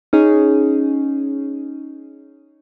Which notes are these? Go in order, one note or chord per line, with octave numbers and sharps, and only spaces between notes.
C#4 D#4 G#4